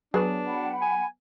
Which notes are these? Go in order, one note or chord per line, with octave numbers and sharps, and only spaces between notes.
F#3 B3 D4 G#4
F#5 G5 B5
G#5